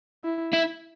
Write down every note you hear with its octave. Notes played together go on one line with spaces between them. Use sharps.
E4
E4